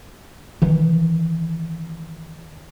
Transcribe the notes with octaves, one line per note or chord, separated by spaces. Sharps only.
D#3 E3